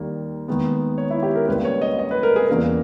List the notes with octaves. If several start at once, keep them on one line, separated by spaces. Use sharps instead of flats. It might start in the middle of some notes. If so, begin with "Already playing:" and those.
Already playing: D#2 D#3 G3 A#3
D#2 D#3 G#3 B3
C#5
E4
G4
A#4
C#2 C#3 G3 A#3 B4
C#5
D#5
D#5
B4
A#4
G#4
E2 C#3 G3 A#3 A#4